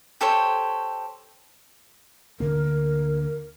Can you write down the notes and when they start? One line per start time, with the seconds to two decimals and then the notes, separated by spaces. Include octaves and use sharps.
0.21 G4 A4 C5 C#5
2.40 D2 D3 A#3 A#4